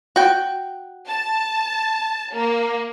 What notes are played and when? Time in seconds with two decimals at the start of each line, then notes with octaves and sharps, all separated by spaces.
0.16 F#4 G5
1.07 A5
2.32 A#3